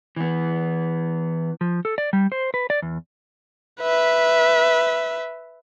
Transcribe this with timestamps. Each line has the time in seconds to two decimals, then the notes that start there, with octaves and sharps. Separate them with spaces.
0.16 E3 B3
1.61 F3
1.85 A4
1.98 D5
2.13 G3
2.32 C5
2.54 B4
2.70 D5
2.82 E2
3.81 B4 E5